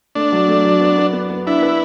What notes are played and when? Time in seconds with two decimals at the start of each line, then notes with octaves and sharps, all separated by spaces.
0.15 A3 D4
0.32 F#3
0.48 A3
0.65 F#3
0.81 B3
0.98 B3
1.13 B3
1.30 B3
1.47 D4 E4
1.63 B4